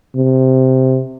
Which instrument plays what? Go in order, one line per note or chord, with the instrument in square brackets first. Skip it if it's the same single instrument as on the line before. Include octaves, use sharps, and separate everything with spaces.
[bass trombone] C3